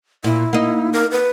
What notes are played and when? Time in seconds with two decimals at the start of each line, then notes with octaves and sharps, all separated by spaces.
0.24 A#2 E4
0.53 A#3 D#4
0.93 A#4
1.11 B4